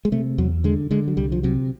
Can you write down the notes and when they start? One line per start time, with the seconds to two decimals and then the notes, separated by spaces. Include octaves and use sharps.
0.05 G#3
0.12 C3 A3
0.38 E2 F#3
0.64 D3 G#3
0.91 D3 G#3
1.08 F#3
1.17 C2 G3
1.32 F3
1.43 C3 F#3